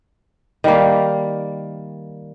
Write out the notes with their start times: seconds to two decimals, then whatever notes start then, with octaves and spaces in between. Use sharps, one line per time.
0.64 D#3 G3 A#3